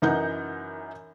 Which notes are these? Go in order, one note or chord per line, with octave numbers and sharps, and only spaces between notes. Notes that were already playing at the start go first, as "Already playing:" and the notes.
F#2 E3 D#4 A#4 F#5 G6